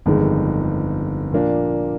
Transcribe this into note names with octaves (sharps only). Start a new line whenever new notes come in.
G1 F2 D#3 G#3
A#2 F3 A#3 D4